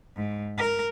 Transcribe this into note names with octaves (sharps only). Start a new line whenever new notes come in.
G#2
A#4